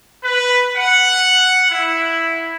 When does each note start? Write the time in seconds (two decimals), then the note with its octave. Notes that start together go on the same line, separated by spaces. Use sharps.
0.24 B4
0.77 F#5
1.70 E4